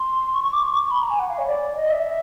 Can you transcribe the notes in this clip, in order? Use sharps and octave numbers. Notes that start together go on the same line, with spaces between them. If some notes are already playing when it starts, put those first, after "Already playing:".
Already playing: C6
C#6
C#6
D6
C#6
D6
C#6
B5
A#5
G#5
F#5
F5
C#5
D5
D#5
E5